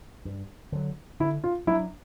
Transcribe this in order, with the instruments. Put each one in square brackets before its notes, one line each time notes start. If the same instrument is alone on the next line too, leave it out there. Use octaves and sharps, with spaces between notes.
[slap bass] G2
D3 F#3
[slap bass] D3 [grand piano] E4
[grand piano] F4
[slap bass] F#3 A#3 D4 [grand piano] E4